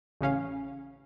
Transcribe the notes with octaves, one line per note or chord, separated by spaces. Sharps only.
A1 C#3 C#4 F5